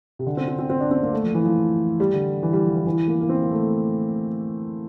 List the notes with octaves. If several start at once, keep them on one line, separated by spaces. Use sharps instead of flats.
C3
D3
C4
C4
C4
C4
D4
C4
A#3
A3
F3
E3
F3
G3
D3
E3
G3
F3
E3
E3
A#3
A#3
C4
A#3
A3